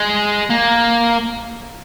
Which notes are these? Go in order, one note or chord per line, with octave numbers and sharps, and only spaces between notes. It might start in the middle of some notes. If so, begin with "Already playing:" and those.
Already playing: G#3
A#3